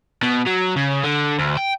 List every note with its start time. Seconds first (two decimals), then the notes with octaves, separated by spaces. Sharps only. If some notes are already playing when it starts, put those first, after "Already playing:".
0.23 B2
0.46 F#3
0.76 C#3
1.04 D3
1.39 D2
1.57 G5